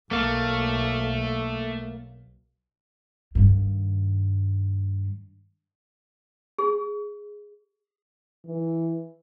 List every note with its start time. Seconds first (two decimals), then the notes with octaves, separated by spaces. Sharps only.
0.11 B1 A3 A#3 F5
3.35 G2 D#3
6.58 G#4
8.45 E3